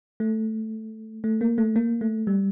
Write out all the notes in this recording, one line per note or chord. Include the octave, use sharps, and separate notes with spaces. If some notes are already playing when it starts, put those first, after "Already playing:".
A3
A3
A#3
A3
A#3
A3
G3